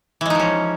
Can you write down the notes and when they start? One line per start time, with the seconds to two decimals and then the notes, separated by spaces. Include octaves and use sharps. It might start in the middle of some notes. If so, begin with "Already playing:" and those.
0.21 E3
0.26 G#3
0.30 D#4
0.35 F3
0.40 C#4